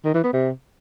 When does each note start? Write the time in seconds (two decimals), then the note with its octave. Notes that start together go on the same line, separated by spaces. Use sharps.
0.05 D#3
0.14 E3
0.24 B3
0.33 C3